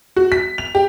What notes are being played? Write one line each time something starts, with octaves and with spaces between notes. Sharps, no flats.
F#4
B6
F7
G4